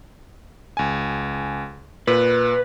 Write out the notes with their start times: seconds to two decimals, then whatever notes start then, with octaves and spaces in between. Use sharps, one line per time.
0.77 C#2 G#5
2.07 A#2 B4